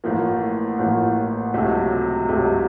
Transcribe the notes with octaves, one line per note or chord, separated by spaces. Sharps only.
A1 A2 F3 A#3
A1 A2 F3 A#3
C#2 C3 F#3 A3
C#2 C3 F#3 A3